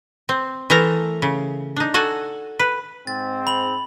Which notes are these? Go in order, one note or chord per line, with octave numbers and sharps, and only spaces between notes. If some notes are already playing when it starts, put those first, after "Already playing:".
C4
E3 A3 A4 A#4 A#5
C#3
D4 D#4
F#4 A4 F#5 G#5
B4
G#2 C4 A6
B5 F#7